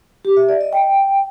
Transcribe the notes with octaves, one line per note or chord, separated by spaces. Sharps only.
G4
E5
D5
D#5
G5